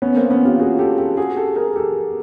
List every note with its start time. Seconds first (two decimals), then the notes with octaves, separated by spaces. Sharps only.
0.02 B3 C#4
0.16 A#3 C4
0.30 B3 C#4
0.45 F4 G4
0.60 F#4 G#4
0.79 G4 A4
0.98 G4 A4
1.17 F#4 G#4
1.37 G4 A4
1.56 G#4 A#4
1.76 G4 A4